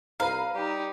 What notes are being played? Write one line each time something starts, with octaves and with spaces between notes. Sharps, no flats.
C2 B4 F5 A#5
G3 D#4 G4